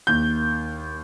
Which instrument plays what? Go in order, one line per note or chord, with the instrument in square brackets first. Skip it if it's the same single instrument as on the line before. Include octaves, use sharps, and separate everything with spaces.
[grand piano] D#2 G6